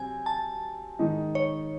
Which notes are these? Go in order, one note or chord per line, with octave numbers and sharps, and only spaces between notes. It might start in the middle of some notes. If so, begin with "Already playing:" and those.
Already playing: C3 F#3 C4 G#5
A5
G#2 D#3 G#3 D#4
C#5